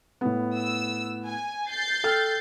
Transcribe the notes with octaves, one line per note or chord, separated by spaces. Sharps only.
A2 B3
E6
G#5
G6 A6 C7
A4 G5 F6